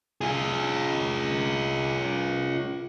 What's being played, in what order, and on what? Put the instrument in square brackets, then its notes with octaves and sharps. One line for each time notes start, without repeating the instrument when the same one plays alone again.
[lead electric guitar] F4 G#4